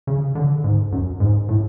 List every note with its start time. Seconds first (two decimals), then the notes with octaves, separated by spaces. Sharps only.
0.07 C#3
0.35 D3
0.64 G#2
0.92 F#2
1.20 G#2
1.49 A2